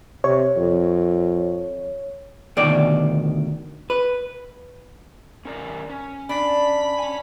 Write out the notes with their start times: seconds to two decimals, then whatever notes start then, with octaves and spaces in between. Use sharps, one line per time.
0.24 C3 C#5
0.56 F2
2.57 D2 B2 D#3 D5
3.90 B4
5.45 C#4 A#4 D5
5.89 C#4
6.29 D4 B5
6.99 C#4 G#5